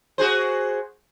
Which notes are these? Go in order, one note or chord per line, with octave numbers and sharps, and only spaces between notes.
F#4 G#4 C5